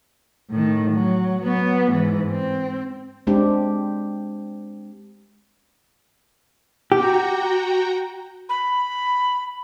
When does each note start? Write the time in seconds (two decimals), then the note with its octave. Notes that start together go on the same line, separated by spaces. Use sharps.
0.50 A2 D#3
0.91 F#3
1.42 F#3 B3
1.92 G#2 E3
2.31 C4
3.27 G#3 C4 D4 G4
6.92 F#4 G4 G5 A#5
8.49 B5